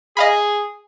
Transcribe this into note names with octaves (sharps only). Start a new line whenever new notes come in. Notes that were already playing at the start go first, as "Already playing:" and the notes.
G#4 D#5 F5 B5